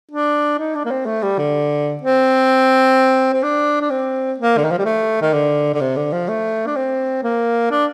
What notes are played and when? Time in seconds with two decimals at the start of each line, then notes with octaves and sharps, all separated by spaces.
0.11 D4
0.59 D#4
0.75 D4
0.85 A#3
0.91 C4
1.06 A3
1.23 G3
1.38 D3
2.02 C4
3.33 C4
3.43 D4
3.81 D4
3.90 C4
4.38 A#3
4.57 D3
4.64 D#3
4.71 F3
4.79 G3
4.85 A3
5.22 D#3
5.33 D3
5.74 D3
5.81 C3
5.96 D3
6.12 F3
6.29 A3
6.67 D4
6.76 C4
7.23 A#3
7.71 D4